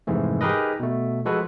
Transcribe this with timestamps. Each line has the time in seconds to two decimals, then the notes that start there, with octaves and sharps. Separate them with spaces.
0.07 F2 G#2 C3 E3 A3
0.41 D#4 G4 G#4 A#4 B4 D#5
0.80 B2 A3
1.25 F3 G#3 F#4 A4 B4